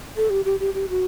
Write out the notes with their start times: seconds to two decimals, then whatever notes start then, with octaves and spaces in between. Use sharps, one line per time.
0.17 A4
0.30 G4
0.45 G4
0.60 G4
0.74 G4
0.89 F#4